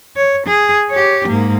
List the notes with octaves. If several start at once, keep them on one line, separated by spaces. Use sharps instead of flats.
C#5
G#4
G4 C#5
G#2 A#3